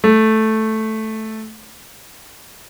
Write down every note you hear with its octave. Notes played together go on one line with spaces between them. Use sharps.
A3